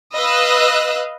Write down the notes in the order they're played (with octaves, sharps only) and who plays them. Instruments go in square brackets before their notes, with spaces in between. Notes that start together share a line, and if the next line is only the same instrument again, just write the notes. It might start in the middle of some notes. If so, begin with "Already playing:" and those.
[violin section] B4 D#5 F5 E6 F#6